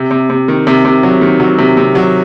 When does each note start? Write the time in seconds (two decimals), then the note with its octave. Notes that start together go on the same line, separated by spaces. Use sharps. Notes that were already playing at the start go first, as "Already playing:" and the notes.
Already playing: C3
0.11 C3
0.30 C3
0.48 D#3
0.67 C3
0.85 C3
1.03 F#3
1.21 D#3
1.40 F#3
1.59 C3
1.77 C3
1.95 F#3